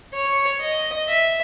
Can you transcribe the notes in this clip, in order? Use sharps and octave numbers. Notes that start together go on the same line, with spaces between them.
C#5
D#5
E5